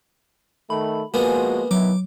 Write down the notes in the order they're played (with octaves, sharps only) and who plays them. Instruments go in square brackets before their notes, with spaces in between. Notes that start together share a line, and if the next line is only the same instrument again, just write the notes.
[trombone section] D#3 A3 [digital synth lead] B5
[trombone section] F3 G#3 F#4 [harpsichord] A#3 B3 [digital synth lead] G#5
[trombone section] D#3 B3 E4 [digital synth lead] F#3 [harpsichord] D6